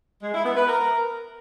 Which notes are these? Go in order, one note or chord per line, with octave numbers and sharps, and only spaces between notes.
G#3
E4
B3
B4
A#4